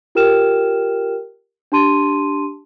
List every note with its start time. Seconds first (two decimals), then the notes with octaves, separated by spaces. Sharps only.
0.15 F4 G4 A#4 G5 F6 E7
1.72 D4 G4 A5 C6 D#7